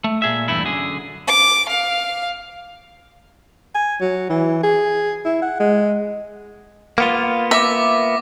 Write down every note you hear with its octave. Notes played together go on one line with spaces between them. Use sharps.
A3
A#2 G#4 E5
E2 G2 A3 E4
F#2 D3 G#4
D6
F5
G#5
F#3
E3
G#4
E4
F#5
G#3
A#3 B3 F4
E5 D6 A#6